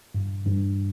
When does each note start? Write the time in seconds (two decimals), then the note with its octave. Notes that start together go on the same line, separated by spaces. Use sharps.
0.15 G2
0.47 G2